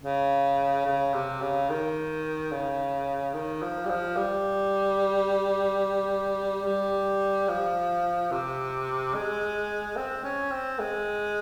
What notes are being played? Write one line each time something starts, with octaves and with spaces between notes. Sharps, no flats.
C#3
C#3
C3
C#3
D#3
C#3
D#3
F3
G3
F3
G3
G3
F3
C3
G#3
C4
C#4
C4
G#3